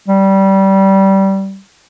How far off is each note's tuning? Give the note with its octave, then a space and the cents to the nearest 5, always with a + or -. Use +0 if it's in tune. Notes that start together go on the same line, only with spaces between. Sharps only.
G3 -20